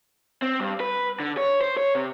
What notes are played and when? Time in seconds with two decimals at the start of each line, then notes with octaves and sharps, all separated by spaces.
0.42 C4
0.60 G2
0.80 B4
1.20 D3
1.37 C#5
1.61 C5
1.77 C#5
1.95 C3